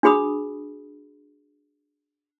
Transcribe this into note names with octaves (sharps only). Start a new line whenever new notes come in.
D4 F#4 G#4 B5 D#6